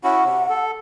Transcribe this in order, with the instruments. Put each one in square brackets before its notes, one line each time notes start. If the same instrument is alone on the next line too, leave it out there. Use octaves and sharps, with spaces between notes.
[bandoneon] C#4 E4 F#4 [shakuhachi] F#5
[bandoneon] C3
A4